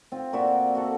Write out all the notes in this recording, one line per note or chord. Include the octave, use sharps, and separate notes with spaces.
C4 F4
A#2 F#4 D5 E5
F#4 A4